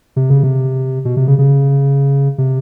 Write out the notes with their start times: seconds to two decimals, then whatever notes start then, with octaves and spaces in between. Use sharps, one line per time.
0.16 C3
0.30 C#3
0.43 C3
1.05 B2
1.17 C3
1.27 C#3
1.38 C#3
2.38 C3